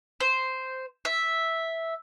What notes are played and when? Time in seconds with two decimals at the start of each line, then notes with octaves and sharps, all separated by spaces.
0.20 C5
1.05 E5